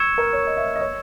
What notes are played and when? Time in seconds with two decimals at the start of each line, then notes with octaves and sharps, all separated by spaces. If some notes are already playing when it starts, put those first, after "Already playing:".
Already playing: C#6 E6 G#6 C#7 E7
0.18 A#4
0.33 C#5
0.47 D#5
0.57 E5
0.76 D#5
0.81 C#5